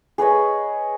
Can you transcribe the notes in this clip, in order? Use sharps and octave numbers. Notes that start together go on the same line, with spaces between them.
G#4 B4 C#5 D#5